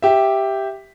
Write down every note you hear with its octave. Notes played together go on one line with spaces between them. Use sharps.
G4 E5